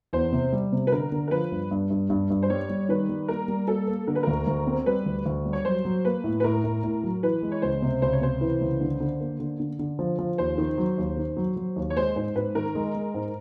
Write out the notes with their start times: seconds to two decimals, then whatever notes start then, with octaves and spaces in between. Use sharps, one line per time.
0.13 E2 C5
0.32 C3
0.52 G3
0.72 C3
0.87 B4
0.92 D3 A#4
1.12 D3
1.28 A#4
1.31 F3 B4
1.52 G2
1.71 G2
1.90 G2
2.10 G2
2.30 G2
2.43 C5
2.50 G3 C#5
2.70 G3
2.89 D#3 B4
3.09 G3
3.28 A#3 A#4
3.48 G3
3.68 A#3 A4
3.87 A#3
4.07 D3 A#4
4.15 B4
4.23 D2 A#4
4.47 D2
4.67 C4
4.86 G3 B4
5.06 D2
5.26 D2
5.46 G3
5.53 C#5
5.65 F#3 C5
5.85 F#3
6.05 A#3 B4
6.24 A2
6.40 B4
6.44 A2 A#4
6.64 A2
6.83 A2
7.03 F#3
7.23 E3 B4
7.43 G#3
7.52 C#5
7.62 C#2 C5
7.82 C3
8.02 C#2 C5
8.13 C#5
8.21 C3 C5
8.41 E3
8.61 C#2
8.81 D3
9.01 D3
9.20 A#3
9.40 D3
9.60 D3
9.79 D3
9.99 F3
10.19 F3
10.38 D#2 C5
10.58 D#3
10.78 F#3
10.98 D#2
11.17 D#3
11.37 F#3
11.56 F#3
11.76 D#2
11.90 C#5
11.96 G#3 C5
12.16 G#2 C5
12.36 G#2 B4
12.55 D#3 A#4
12.75 G#3
12.95 G#3
13.14 G#2